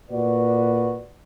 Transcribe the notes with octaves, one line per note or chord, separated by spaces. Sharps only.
A#2 F#4 B4 D5